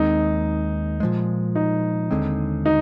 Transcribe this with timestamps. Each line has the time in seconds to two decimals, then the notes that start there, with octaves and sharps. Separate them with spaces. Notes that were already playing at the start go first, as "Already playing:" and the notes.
Already playing: D#2 D#3 G#3 C4 D#4
1.00 A#2 F3 G#3
1.55 D#4
2.11 D#2 D3 G#3 C4
2.66 D#4